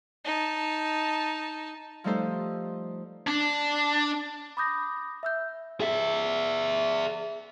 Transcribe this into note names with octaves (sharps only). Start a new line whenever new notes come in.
D#4 A5
F3 G3 A3 D#4 A4 C5
D4
B5 D6 D#6 G6 A#6
E5 E6 G6
G#4 E5